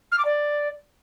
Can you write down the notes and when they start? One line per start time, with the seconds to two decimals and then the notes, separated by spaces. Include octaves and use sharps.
0.12 F6
0.18 D6
0.25 D5